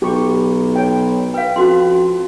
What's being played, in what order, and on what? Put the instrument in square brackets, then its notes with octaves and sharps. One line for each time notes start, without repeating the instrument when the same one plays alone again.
[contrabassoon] B1 [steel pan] G4 C#6
[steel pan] C#5 G5
[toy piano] B4 F5 [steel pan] G5
[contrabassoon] F2 [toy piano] C#4 F#4 C6